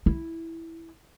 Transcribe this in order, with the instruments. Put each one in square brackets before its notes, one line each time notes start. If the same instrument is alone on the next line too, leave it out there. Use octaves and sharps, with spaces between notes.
[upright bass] E4